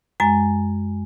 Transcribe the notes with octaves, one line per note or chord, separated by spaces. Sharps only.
F#2 G#3 G#5